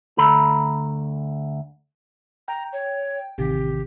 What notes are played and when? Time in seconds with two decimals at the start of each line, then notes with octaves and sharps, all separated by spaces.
0.18 D2 A4 A#5 B5
2.48 G5 A#5
2.73 C#5
3.38 A1 C3 D#3 G4